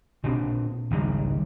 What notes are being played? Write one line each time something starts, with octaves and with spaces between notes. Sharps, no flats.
A#2 C4 D4
G#1 C#2 D#3 G3